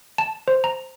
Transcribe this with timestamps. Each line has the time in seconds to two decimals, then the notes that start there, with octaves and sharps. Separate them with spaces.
0.18 A5
0.48 C5
0.64 A#5